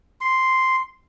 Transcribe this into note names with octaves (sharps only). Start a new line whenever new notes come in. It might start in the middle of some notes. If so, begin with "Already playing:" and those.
C6